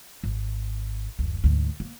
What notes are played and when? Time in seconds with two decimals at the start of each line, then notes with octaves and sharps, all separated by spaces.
0.24 G#1
1.19 F#1 D2
1.44 D2 G#2
1.80 A#3